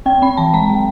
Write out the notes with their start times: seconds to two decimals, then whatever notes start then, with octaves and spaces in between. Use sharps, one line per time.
0.06 C4 G5
0.22 C4 B5
0.37 E3 A5
0.53 G#3 A#5
0.69 F#3